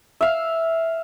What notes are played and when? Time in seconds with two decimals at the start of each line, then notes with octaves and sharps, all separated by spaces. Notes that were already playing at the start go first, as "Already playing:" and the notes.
0.21 E5 F5